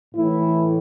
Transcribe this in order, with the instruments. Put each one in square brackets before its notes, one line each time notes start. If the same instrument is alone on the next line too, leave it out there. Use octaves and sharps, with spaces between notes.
[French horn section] A2 E3 E4